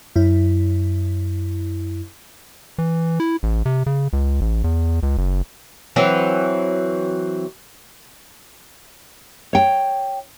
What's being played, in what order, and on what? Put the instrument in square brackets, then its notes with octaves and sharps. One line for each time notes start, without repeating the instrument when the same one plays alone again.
[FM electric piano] F#2 E4
[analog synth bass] E3
E4
A1
C3
C#3
C#2
A1
E2
C#2
F#1
[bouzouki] E3 F#3 C4
[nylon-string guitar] C#5 G5